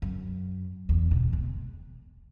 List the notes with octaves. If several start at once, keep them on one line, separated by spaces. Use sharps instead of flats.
F#2
E2
B2
G#3